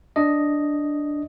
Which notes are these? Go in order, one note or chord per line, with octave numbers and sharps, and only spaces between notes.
D4 D#5